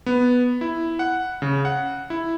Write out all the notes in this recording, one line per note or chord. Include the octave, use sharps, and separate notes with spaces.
B3
E4
F#5
C#3
F#5
E4